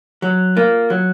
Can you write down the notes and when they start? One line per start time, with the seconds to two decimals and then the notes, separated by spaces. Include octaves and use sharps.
0.22 F#3
0.57 A#3 F4
0.90 F#3